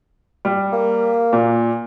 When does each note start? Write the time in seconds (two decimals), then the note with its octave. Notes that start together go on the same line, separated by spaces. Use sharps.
0.45 G3
0.73 A#3
1.33 A#2